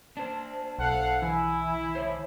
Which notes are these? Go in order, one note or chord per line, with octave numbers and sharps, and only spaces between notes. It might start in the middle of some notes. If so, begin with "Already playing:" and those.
D4 C5 A5
B1 A4 F5 F#5
E3 E4 G#5
D#3 C5 C#5